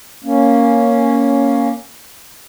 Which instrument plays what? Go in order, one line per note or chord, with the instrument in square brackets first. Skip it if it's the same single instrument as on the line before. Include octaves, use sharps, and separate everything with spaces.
[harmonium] A#3 C#4